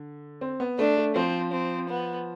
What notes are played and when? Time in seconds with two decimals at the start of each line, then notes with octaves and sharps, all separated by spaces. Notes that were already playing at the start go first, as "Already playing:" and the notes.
Already playing: D3
0.41 C4
0.60 B3
0.78 A3 D4
0.97 A3
1.15 F3 C4
1.53 C4
1.89 B3